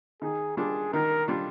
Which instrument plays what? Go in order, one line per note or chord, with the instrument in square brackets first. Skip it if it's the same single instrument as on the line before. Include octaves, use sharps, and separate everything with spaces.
[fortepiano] D#3 [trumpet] G#4
[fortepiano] G3 D4 F4 [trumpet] G#4
[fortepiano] D#3 [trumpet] A#4
[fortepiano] G3 D4 F4